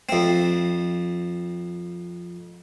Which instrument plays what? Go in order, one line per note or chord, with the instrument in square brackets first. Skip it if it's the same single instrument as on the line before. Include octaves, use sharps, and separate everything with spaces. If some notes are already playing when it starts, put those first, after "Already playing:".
[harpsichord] F2 C4